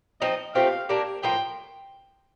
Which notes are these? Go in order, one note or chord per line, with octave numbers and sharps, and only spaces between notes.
F3 C4 D#4 D#5
F3 A3 C4 G4 F5
A#3 D4 G4 A#4
A2 F3 A#3 F4 G5